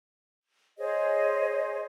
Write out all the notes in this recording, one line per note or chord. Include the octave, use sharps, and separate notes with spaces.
G#4 C5 C#5 D#5